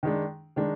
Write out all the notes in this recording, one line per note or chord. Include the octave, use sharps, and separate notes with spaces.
D#3 G#3 D4
D#3 G#3 D4